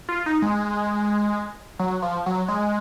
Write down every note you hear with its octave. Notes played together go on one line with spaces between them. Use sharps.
F4
D#4
G#3
F#3
F3
F#3
G#3